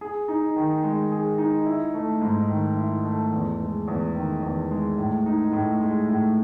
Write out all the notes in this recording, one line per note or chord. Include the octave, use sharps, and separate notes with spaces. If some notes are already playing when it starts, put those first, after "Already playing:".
G#4
D#4
D#3
G#3
G#4
D#4
E4
A3
G#2
D#3
E4
A3
E2
G#3
E2
D#3
E2
G#3
A2
D#4
A2
G#3
A2